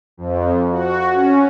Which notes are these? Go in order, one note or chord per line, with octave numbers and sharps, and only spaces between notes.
F2
F#4
C#4